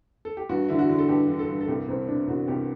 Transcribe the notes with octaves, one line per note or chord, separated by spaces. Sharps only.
A4
G4
G2 F#4
D3 E4
F#4
D3
A4
G2 G4
D3
A4
G2
A4
C2 G4
C2 C4
B2 D4
C2 F#4
C2 G4